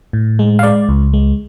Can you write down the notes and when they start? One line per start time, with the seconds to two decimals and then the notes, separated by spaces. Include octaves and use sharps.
0.13 A2
0.39 G#3
0.59 F5
0.63 G#3 D5
0.89 C#2
1.13 G#3